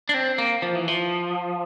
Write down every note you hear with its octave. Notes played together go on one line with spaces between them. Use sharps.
D4
C4
A#3
F3
E3
F3